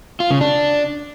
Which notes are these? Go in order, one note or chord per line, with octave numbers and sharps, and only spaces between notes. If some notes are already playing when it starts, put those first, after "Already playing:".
F4
C#3
D4